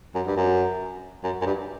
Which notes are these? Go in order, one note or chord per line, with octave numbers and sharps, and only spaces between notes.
F#2
G2
F#2
F#2
F#2
G2